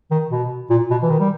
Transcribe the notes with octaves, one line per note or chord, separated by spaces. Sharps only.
D#3
B2
A#2
B2
E3
D#3
G3